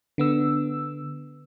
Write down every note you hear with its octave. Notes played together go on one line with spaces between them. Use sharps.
D3 B3 E6